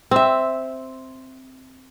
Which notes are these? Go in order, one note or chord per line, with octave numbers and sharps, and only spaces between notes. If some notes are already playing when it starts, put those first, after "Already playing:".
C4 E5